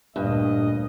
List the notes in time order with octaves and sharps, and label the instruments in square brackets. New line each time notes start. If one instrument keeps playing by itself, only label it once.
[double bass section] D2 A#2 [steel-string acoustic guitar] G2 [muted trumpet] D#5